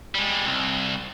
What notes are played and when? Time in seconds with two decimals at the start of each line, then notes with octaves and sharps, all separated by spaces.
0.15 G3 G#3
0.46 C2